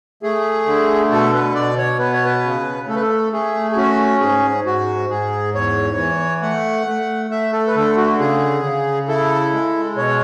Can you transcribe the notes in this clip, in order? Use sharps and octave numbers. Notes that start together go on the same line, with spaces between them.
A3 G#4
D3
B2 A4
B4
B2 D5
C#5
B3 B4
C#5
B4
C#3
A3 A4
B4
A4
A3 G#4
G#4
C#4 F#4
G#2 G#4
G#2 F#4
G#2 G#4
E2 C#5
E3
A3 F#5
A3
A3 E5
A4
B4
D3 A4
F#4
C#3 G#4
C#3
E4 A4
G#3
B2 C#5